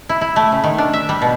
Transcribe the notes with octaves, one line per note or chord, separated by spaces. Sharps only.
E4
E4
A3
C#3
D#3
D4
E5
G3
B2